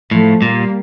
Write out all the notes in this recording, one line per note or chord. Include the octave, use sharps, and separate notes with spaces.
A2 F3 A3
A#2 G3 A#3